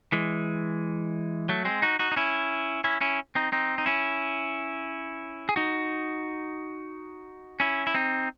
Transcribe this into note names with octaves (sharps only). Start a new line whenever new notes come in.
E3 G#3
F#3 A3
G#3 C4
D#4 F#4
D#4 F#4
D#4
C#4 E4
C#4 E4
C#4 E4
C4 D#4
C4 D#4
D#4
C#4 E4
G#4
D#4 F#4
C#4 E4
E4
C4 D#4